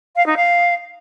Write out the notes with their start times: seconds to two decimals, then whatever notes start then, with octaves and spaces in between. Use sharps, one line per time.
0.16 F5
0.26 D#4
0.36 F5